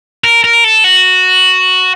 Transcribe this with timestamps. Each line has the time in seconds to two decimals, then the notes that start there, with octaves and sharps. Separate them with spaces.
0.24 A#4
0.44 A#4
0.64 A4
0.84 F#4